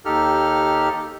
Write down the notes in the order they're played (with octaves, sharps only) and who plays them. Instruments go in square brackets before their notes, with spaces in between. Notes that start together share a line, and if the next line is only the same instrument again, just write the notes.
[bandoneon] D#2 D#4 G4 A4 F6